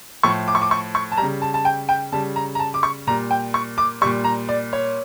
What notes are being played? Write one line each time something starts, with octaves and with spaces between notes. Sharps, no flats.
A2 F3 C#6
D6
C#6
D6
C#6
C#6
A5
G3 A#5
C#3
A5
A5
G5
G5
C#3 G3 A5
A#5
A#5
A5
D6
C#6
A#2 G3 A#5
G5
C#6
D6
A#2 G3 C#6
A#5
D5
C#5